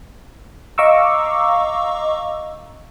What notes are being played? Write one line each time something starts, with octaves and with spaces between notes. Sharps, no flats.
D#5 F5 A#5 C#6 D6 E6